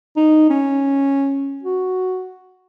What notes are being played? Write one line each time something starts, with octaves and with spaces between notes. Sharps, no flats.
D#4
C#4
F#4